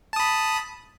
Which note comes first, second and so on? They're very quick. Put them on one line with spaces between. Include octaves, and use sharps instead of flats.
A5 D#6 B5